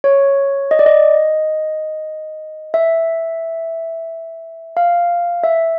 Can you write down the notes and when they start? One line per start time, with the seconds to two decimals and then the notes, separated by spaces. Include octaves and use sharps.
0.04 C#5
0.71 D#5
0.79 D5
0.86 D#5
2.74 E5
4.77 F5
5.44 E5